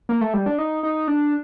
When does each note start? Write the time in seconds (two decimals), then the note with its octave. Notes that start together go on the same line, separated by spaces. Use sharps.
0.09 A#3
0.21 A3
0.34 G3
0.46 D4
0.58 D#4
0.83 D#4
1.08 D4